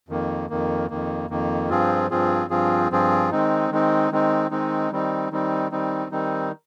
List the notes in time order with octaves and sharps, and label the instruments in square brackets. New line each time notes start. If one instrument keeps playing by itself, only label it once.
[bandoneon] F2 D#3 A#3
F2 D#3 A#3
F2 D#3 A#3
F2 D#3 A#3
G2 F3 C4 F4 G#4
G2 F3 C4 F4 G#4
G2 F3 C4 F4 G#4
G2 F3 C4 F4 G#4
D#3 G#3 C4 D#4
D#3 G#3 C4 D#4
D#3 G#3 C4 D#4
D#3 G#3 C4 D#4
D#3 G3 C4 D#4
D#3 G3 C4 D#4
D#3 G3 C4 D#4
D#3 G3 C4 D#4